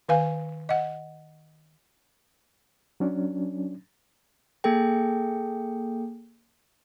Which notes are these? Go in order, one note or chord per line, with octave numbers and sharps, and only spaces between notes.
D#3 B4 F5 G#5
D#5 F#5
F#3 C#4 D4
A#3 G#4 A4 G5